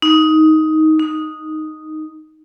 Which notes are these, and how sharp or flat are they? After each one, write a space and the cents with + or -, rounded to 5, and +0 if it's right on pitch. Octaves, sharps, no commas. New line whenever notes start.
D#4 +10
D#4 -5